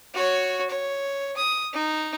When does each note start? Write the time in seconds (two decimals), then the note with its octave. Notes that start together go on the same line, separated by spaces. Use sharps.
0.14 F#4 C#5
0.70 C#5
1.36 D#6
1.73 D#4